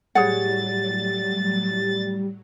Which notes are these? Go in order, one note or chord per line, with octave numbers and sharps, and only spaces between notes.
A2 F#3 G3 G#4 C#5 F#5 A6